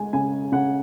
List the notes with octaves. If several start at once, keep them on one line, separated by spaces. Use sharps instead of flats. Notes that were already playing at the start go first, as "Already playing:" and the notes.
Already playing: G#3 G#5
C#3 G#5
C#3 F#5